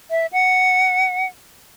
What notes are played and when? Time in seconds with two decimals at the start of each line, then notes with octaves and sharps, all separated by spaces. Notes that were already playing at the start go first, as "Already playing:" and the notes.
0.11 E5
0.33 F#5